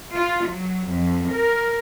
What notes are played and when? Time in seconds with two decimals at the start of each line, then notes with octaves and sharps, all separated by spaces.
0.17 F4
0.50 F#3
0.94 F2
1.34 A#4